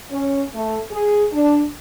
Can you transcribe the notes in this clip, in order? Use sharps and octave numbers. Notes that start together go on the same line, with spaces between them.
C#4
A3
G#4
D4